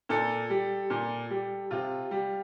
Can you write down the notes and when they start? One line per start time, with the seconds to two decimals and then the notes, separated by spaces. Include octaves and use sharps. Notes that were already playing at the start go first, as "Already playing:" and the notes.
0.09 A#2 A4
0.50 G3
0.90 A#2
1.30 G3
1.71 C3 F4
2.11 G3